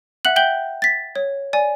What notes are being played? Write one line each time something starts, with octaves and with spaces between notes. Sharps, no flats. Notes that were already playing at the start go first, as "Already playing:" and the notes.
E5 F#5 F#6 F#7
E5 G5 G6 F#7 G7
A6 B6
C#5
D5 G#5